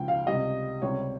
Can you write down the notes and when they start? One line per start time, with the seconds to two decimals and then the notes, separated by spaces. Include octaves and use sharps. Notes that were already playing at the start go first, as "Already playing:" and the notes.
Already playing: C#2 C#3 F3 G5
0.08 F5
0.26 C#2 C3 G3 D#5
0.82 C#2 C3 G3 C#5